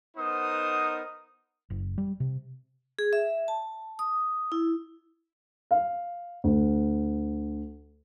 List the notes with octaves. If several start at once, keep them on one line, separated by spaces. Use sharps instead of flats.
B3 D#4 A#4 C5 F#5 D#6
F#1
G3
C3
G#4
E5
A5
D#6
E4
F5
D2